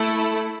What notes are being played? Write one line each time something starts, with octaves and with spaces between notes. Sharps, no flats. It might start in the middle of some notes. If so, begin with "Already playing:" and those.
Already playing: A3 E4 A4